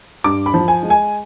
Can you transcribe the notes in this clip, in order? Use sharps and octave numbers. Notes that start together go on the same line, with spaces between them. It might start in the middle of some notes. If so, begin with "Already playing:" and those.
G2 D6
B5
F3
G#5
G#3
G#5